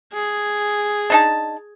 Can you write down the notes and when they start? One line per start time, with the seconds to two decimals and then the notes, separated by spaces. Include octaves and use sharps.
0.13 G#4
1.10 D4 D#4 A5